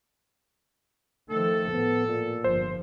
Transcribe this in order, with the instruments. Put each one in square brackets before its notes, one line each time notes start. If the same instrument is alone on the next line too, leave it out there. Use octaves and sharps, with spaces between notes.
[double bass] D#3 F3 [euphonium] A3 [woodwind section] A4
[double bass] A2 [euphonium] B3
[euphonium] A#2
[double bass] G1 F3 [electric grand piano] C5